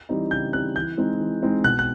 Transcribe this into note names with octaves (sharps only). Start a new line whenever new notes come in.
E3 G3 C4 D#4
C#3 G6
E3 G3 C4 D#4 F#6
E3 G6
G#3 C4 D#4
E3
G#3 C4 D#4
B2 F#6
F#6